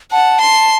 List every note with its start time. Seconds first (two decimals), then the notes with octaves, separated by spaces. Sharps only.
0.11 F#5 A5
0.41 C6